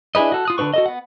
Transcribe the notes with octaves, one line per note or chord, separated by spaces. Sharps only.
D4 E4 G#4 B4 D#5
F#4 A4
F4 D#6 F#6
D3 D4 F4 B4 C#6
F#4 A4 D#5
B3 F#5